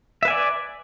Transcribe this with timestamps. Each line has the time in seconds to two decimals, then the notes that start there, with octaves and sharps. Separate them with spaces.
0.23 E5
0.25 B4
0.28 G#5
0.30 D5